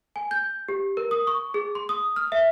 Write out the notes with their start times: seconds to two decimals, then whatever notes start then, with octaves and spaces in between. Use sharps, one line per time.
0.16 G#5
0.31 G6
0.69 G4
0.97 A#4
1.11 D#6
1.27 C#6
1.54 G#4
1.75 C6
1.89 D#6
2.16 F6
2.32 E5